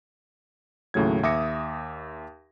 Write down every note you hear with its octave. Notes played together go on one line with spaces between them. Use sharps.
D#2 A2 C#3 F#3 G#6
D#2 E5 D6 D#6 A#6 C#7